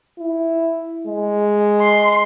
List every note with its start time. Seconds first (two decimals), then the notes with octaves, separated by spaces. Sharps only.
0.18 E4
1.07 G#3
1.80 C6